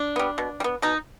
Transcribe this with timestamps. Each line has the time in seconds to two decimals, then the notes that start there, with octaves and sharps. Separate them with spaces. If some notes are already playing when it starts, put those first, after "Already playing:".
Already playing: D4
0.16 G3 B3
0.38 B2
0.60 G3
0.64 B3
0.82 B2 D#4